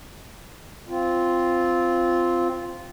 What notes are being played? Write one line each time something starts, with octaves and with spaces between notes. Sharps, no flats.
C4 F4